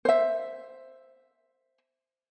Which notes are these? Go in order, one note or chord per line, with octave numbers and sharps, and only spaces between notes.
C5 E5